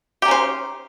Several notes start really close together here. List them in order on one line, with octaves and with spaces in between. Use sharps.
G4 D#4 C#4 C5